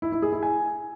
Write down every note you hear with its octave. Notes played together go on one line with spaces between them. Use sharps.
E4
E4
G#4
E4
G#5